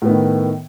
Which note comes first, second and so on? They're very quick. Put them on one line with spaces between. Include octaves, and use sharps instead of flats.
A2 B3 D#3